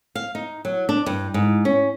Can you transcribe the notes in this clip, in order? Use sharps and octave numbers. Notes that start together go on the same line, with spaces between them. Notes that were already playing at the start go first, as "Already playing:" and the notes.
F5
D#4
F#3
D4
G2
G#2
C#4